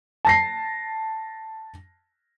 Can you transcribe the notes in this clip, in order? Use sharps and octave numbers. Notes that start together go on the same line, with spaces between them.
A5 A#6 C7